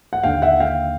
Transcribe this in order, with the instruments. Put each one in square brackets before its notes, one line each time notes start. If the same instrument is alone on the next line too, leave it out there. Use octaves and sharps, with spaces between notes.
[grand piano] F#5
D#2 D3 F5 G5
E5 F#5
F5 G5